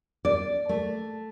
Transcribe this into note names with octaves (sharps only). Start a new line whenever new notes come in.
D5
A3